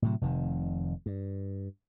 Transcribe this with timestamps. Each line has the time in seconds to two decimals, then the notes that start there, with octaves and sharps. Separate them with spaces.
0.02 A2 C3 F#3
0.21 F1 C3 D#3
1.06 G2